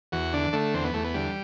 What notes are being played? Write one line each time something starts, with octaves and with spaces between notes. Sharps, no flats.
E2 F#4
D3 D4
D3 A3
E2 C4
B3
E2 A3
B3
D3 G3